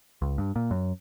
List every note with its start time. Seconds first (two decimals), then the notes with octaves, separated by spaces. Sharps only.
0.22 C#2
0.38 G2
0.56 A#2
0.71 F#2